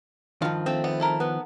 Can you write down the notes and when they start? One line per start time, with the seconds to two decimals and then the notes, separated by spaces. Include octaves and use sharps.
0.42 G2 D#3 F3 F5 A5
0.66 A3 C4
0.84 B3
1.00 E4 A4 A#4
1.20 B3